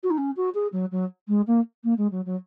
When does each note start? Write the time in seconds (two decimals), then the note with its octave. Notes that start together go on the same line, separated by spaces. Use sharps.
0.03 F#4
0.10 D#4
0.18 C#4
0.36 F#4
0.54 G#4
0.72 F#3
0.91 F#3
1.28 G#3
1.47 A#3
1.84 A#3
1.97 G#3
2.11 F#3
2.26 F#3